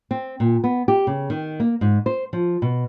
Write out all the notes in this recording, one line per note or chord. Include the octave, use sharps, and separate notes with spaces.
C4
A#2
B3
G4
C#3
D#3
A#3
G#2
C5
F3
B2